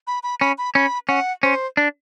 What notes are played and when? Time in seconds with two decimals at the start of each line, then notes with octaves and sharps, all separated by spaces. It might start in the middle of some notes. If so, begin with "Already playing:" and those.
0.07 B5
0.23 B5
0.40 C#4 B5
0.58 B5
0.75 C#4 B5
1.08 C#4 F#5
1.43 C#4 C5
1.77 D4